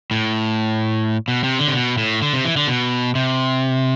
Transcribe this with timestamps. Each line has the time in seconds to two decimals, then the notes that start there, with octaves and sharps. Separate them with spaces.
0.11 A2
1.28 B2
1.44 C3
1.59 D3
1.68 C3
1.75 B2
1.98 A2
2.22 D3
2.34 C3
2.45 E3
2.57 D3
2.68 B2
3.15 C3